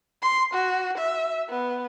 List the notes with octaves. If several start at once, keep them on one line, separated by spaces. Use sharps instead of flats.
C6
F#4
E5
B3